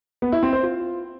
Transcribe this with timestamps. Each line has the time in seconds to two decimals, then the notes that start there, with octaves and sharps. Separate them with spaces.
0.22 B3
0.32 E4
0.43 C4
0.53 C5
0.63 F4